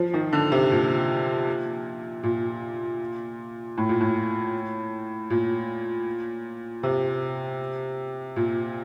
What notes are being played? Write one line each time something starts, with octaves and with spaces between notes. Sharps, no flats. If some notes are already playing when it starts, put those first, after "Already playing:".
Already playing: F3
D#3
D3
C3
A#2
A#2
A2
A#2
A2
A#2
C3
A#2